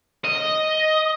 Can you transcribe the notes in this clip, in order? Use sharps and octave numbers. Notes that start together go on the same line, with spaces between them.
D#5